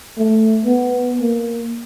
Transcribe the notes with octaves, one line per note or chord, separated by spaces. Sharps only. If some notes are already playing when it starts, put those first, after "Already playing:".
A3
B3
A#3